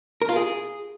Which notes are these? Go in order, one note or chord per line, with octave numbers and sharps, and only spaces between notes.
A#4
F4
G#4